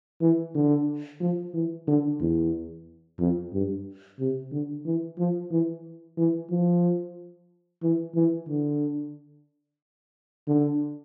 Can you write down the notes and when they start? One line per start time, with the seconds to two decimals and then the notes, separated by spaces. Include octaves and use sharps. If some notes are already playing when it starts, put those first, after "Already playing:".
0.21 E3
0.55 D3
1.21 F3
1.54 E3
1.88 D3
2.21 E2
3.20 F2
3.53 G2
4.20 C3
4.52 D3
4.86 E3
5.19 F3
5.51 E3
6.18 E3
6.51 F3
7.83 E3
8.16 E3
8.49 D3
10.48 D3